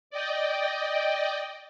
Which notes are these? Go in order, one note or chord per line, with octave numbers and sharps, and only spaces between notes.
D5 D#5 G5